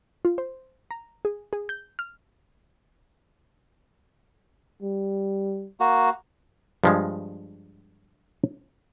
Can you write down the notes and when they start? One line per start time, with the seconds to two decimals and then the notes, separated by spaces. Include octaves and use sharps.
0.25 F4
0.38 C5
0.91 A#5
1.25 G#4
1.53 G#4
1.69 G6
1.99 F6
4.82 G3
5.80 A#3 F#4
6.84 G2 F3 G#3